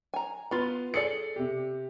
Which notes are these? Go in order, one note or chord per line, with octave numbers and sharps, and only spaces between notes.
G#5 A#5
B3 F4 B5
G#4 A4 D5 C#7
C3 G4